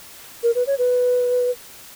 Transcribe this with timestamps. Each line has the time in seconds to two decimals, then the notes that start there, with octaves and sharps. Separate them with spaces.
0.43 A#4
0.55 B4
0.67 C#5
0.78 B4